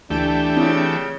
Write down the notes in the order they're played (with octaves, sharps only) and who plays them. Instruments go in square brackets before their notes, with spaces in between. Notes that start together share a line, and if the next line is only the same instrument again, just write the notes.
[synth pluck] D2 G#5 D7 [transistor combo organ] E3 A3 G4 [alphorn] D4
[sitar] C#3 [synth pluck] C4 E4 F4